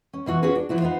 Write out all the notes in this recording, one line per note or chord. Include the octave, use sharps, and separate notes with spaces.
C#4
B2 E3 F#4
C#4 F4 F#4 G#4 B4
D4
E3 F3 E4 F#4
B3 D#4 F4 C5